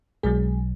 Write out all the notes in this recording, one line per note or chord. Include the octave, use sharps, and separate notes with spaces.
B1 B2 F#3 G#3 G#4